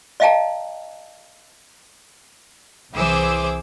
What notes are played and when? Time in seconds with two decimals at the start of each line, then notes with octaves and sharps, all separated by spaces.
0.20 D5 D#5 F5 G5 A5 A#5
2.94 C2 E3 G#4 C5 D6 E6